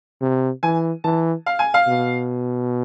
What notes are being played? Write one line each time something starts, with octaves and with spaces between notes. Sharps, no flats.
C3
E3 G#5
E3 A5
F5
G#5
F5
B2